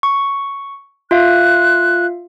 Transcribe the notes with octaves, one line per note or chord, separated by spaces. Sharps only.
C#6
F4 E5 F5 F#6